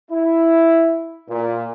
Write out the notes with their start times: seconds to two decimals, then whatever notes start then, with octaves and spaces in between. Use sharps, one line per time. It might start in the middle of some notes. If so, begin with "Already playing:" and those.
0.11 E4
1.30 A#2